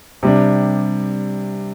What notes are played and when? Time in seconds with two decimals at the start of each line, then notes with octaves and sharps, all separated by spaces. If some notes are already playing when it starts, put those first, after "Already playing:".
0.23 C3 G3 D4